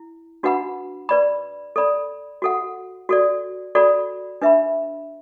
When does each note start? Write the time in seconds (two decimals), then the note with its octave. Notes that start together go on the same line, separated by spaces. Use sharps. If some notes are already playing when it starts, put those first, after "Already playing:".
Already playing: E4
0.43 D4 F#4 B4 F#5 B5
1.09 B4 D5 B5
1.76 A4 D5 B5
2.42 F#4 A4 F#5
3.09 F#4 A4 D5
3.75 F#4 A4 D5 B5
4.42 D4 B4 E5 B5